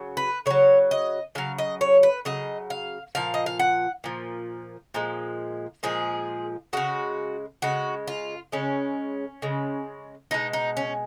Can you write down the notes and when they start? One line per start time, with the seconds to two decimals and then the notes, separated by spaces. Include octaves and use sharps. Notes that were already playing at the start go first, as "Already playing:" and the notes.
Already playing: C#3 F#3
0.17 B4
0.46 C#3 F#3 C#5
0.91 D#5
1.35 C#3 F#3 F5
1.58 D#5
1.81 C#5
2.03 B4
2.25 C#3 F#3 D#5
2.70 F5
3.15 A#2 F3 F5
3.34 D#5
3.46 F5
3.59 F#5
4.04 A#2 F3
4.94 A#2 F3 G#3
5.83 A#2 F3 G#3 G#4
6.73 C#3 G#3 F#4
7.62 C#3 G#3 F#4
8.08 F4
8.52 C#3 G#3 C#4
9.42 C#3 G#3
10.31 B2 G#3 D#4
10.53 D#4
10.77 C#4